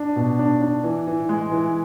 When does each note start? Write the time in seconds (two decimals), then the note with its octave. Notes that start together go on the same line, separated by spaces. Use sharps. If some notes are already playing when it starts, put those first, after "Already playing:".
Already playing: D4
0.16 B2
0.39 D4
0.62 D4
0.84 E3
1.07 E3
1.29 G#3
1.51 E3